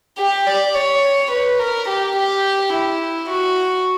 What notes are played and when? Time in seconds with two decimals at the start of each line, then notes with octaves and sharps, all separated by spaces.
0.18 G4
0.46 D5
0.75 C#5
1.31 B4
1.59 A#4
1.88 G4
2.16 G4
2.73 E4
3.30 F#4